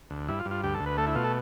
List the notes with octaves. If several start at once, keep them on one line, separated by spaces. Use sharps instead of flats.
D2
G2 E4
F4
G2
F4
D2 G4
A4
D2
B4
A3 A4
E4
B2 F4
A4